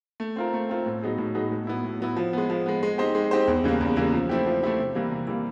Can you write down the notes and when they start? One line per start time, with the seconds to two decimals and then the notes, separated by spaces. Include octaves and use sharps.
0.20 A3
0.36 C4 F4 A#4
0.54 A3
0.69 C4 F4 A#4
0.86 A2
1.03 F#3 B3 D#4 G#4
1.18 A2
1.34 F#3 B3 D#4 G#4
1.52 A2
1.67 F#3 B3 E4
1.84 A2
2.01 F#3 B3 E4
2.16 F3
2.33 G#3 B3
2.50 F3
2.66 G#3 B3
2.83 G#3
2.98 C4 D#4 G4 C5
3.15 G#3
3.31 C4 D#4 G4 C5
3.48 E2
3.64 C#3 E3 G3 A#3
3.81 E2
3.96 C#3 E3 G3 A#3
4.13 F3
4.29 A3 C4 E4 G4
4.46 F3
4.63 A3 C4 E4 G4
4.79 C3
4.95 E3 G3 A#3
5.11 C3
5.27 E3 G3 A#3